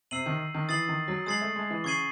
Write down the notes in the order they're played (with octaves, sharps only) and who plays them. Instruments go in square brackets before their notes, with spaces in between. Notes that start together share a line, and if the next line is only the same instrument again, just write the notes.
[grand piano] C3 [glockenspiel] E6 C7 D#7 F#7
[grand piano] D#3
D#3
[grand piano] E3 [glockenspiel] D#6 A6 C7 F#7
[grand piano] D#3
F#3
[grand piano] G#3 [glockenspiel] D#6 A6 C7 F#7
[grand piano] A3
G#3
E3
[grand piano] C#3 [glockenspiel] C#6 G#6 C7 D#7 F#7